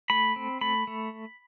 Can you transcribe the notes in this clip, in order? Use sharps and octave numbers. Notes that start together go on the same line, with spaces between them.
A3 B5
C4
A3 B5
A3